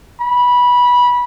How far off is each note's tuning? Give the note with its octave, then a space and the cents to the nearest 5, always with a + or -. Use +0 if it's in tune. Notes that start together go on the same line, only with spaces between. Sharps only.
B5 -15